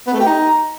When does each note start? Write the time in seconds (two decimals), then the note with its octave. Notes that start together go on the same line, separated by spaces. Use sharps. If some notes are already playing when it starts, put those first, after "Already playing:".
0.07 B3
0.14 A3
0.20 G4
0.26 D#4